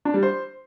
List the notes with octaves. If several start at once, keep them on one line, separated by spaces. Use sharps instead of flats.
D4
G3
C5